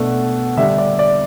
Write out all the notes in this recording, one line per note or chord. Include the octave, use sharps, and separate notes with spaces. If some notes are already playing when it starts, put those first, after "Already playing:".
Already playing: B2 A3 D4 F#5
D3 G3 D4 E5
D5
D5